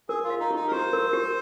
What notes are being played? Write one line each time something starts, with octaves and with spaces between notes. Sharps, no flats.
G#4 A#4
F4
F5
D#4
G4
D#4
A#4
G4 C5
A#4
G4